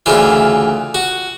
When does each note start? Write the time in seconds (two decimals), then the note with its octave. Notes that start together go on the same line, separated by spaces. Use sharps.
0.06 D2 C#3 E3 F4
0.95 F#4